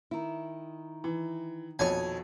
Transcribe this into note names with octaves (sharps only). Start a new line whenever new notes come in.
D#3 E4
E3
A#1 F2 B2 C#5 G#5